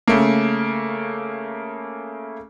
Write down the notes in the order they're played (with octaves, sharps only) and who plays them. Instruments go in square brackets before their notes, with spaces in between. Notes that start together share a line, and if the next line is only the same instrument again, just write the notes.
[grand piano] C#3 A3 A#3